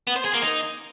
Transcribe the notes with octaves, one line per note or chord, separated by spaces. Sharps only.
B3
C5
G#4
A#3
D#4